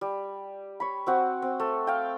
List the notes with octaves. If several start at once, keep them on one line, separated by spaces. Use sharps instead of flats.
G3
C#5 B5
C4 F#4 F#5
C4
A3
F5 G5